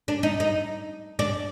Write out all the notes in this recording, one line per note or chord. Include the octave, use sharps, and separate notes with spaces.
D4
D#4
D#4
D4